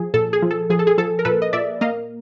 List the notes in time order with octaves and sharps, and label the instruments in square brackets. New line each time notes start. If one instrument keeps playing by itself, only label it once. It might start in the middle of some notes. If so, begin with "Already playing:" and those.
Already playing: [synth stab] F3 G#4
A#2 A4
G#4
F3
A4
F3 G#4
A4
G#4
F3 A4
A#4
A#2 A4 B4
D#5
A#2 D5 E5
A#3 D#5 F5